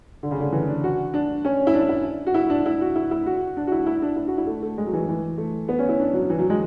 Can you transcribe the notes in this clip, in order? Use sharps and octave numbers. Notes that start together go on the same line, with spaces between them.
D3
C#3
D3
E3
D4
F#4
D4
C#4
E4
D4
E4
F#4
E4
D4
E4
F#4
E4
E4
F#4
D4
F#4
E4
E4
D4
E4
F#4
E4
A3
A3
G#3
F#3
E3
E3
A3
B3
C#4
E4
D4
F#3
E3
F#3
G#3